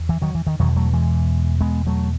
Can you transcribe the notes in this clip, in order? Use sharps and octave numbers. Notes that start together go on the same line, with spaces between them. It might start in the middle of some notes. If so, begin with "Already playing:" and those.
Already playing: E2
E3
D#3 F#3
E3
D#3
E2 B2 D#3 F#3
F#3 A3
E3 G#3
G#3 B3
F#3 A3